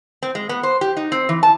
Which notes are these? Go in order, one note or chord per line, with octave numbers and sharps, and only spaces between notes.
C4
G#3
B3
C5
G4
D#4
C4
E3
A5